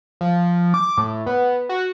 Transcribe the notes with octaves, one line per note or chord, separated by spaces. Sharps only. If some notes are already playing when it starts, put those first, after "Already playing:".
F3
D6
A2
B3
F#4